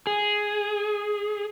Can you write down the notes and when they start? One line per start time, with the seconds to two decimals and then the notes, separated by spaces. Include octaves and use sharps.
0.07 G#4